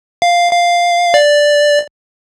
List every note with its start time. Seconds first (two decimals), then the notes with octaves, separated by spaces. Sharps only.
0.22 F5
0.52 F5
1.14 D5